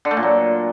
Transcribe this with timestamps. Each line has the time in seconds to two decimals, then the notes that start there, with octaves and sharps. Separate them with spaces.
0.05 D3
0.11 A3
0.17 A#2
0.23 F#3